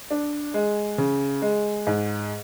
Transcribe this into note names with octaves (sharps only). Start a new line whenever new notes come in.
D4
G#3
C#3
G#3
G#2